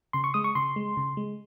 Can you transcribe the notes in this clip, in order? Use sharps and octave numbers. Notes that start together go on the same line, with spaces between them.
C#3 C6
C#6
G#3 D#6
C#6
C#3 C6
G#3
C#3
G#3